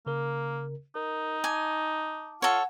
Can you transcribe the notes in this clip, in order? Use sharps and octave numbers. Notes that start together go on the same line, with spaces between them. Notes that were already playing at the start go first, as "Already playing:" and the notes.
C#3 A#3 A#4
D#4 A#4
G#5 A5 D6
F4 A4 C#5 F#5